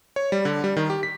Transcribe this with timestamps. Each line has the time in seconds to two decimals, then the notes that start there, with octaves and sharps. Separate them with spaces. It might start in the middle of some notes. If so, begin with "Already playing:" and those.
0.16 C#5
0.32 G3
0.45 D3
0.64 G3
0.77 D#3
0.90 G4
1.03 B6